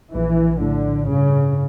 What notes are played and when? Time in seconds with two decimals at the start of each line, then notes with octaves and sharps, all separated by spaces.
0.14 A#1 E3
0.60 A2 D3
1.07 G2 C#3